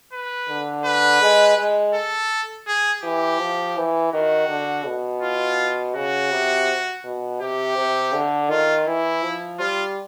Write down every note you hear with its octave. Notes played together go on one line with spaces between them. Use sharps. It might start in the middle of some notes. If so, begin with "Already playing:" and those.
B4
D3
B4
G#3
G#3
A4
G#4
E3 G4
F3
E3
D#3 F#4
D3
B2
F4
C#3 F#4
C3
B2
C3 G4
C3
D3
D#3 F4
E3 E4
F3
G3 F4